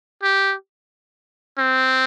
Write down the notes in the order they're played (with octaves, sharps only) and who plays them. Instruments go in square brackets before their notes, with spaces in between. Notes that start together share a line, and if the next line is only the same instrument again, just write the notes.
[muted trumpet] G4
C4